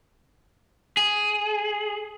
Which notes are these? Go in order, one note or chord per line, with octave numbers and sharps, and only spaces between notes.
G#4